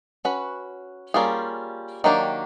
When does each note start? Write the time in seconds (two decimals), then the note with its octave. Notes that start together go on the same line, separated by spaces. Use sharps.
0.25 C#4 F#4 B4
1.14 G3 A#3 C#4 F4 G#4
2.04 D#3 F#3 A#3 D4 G4